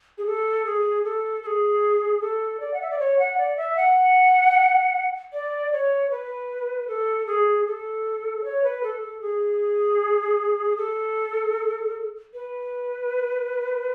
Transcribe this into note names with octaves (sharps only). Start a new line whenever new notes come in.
G#4
A4
G#4
A4
A4
G#4
A4
D5
F#5
E5
D5
C#5
F#5
D5
E5
F#5
D5
C#5
B4
A4
G#4
A4
C#5
B4
A4
A4
G#4
A4
B4